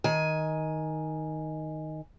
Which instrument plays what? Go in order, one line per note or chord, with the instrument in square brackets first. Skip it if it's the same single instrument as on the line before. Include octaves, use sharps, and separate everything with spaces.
[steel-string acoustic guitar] D#3 G#5